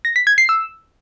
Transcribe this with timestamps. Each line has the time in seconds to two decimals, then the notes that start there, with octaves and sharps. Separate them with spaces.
0.05 A#6
0.16 B6
0.27 G#6
0.38 C7
0.49 E6